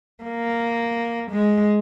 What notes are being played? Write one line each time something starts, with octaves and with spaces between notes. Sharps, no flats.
A#3
G#3